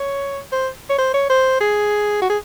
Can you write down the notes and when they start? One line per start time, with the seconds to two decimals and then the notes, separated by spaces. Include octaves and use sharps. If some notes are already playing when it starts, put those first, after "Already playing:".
Already playing: C#5
0.52 C5
0.90 C#5
0.98 C5
1.14 C#5
1.30 C5
1.61 G#4
2.22 F#4
2.30 G#4